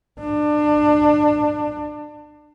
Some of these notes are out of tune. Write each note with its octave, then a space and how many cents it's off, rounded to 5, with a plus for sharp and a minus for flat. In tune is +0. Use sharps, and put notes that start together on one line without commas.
D4 +25